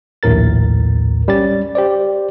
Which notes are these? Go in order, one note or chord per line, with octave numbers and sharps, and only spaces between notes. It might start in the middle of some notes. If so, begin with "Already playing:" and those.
A#1 D#2 A2 A#4 A6
G3 C#4 G4 A6
G4 C5 D5